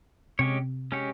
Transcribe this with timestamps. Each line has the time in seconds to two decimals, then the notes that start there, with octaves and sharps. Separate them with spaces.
0.39 C3 G#3 C#4 G4 C#5
0.92 G#3 C#4 G4 C#5